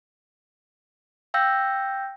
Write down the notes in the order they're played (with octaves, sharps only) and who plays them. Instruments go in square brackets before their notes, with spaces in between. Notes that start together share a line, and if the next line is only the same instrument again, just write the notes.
[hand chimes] F5 G5 E6 G6 A#6